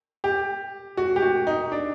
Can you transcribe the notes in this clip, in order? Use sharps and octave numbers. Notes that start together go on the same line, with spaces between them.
G4
F#4
G4
F#4
D#4
D4